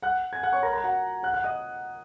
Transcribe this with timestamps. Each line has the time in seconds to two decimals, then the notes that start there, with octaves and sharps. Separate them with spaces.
0.02 F#5 F#6
0.33 G#5 G#6
0.43 F#5 F#6
0.53 C#5 C#6
0.63 A#4 A#5
0.73 A#4 A#5
0.84 F#4 F#5
1.23 F#5 F#6
1.33 F#5 F#6
1.44 D#5 D#6